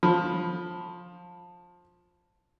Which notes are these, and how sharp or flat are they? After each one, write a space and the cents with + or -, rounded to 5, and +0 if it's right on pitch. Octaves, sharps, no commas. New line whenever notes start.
F3 +15 B5 +0